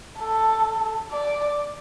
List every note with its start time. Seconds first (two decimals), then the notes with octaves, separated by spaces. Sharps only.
0.19 A4
1.11 D5